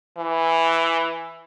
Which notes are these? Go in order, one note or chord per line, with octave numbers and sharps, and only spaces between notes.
E3